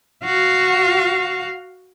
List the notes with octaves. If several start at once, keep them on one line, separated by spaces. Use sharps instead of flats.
F#4 F5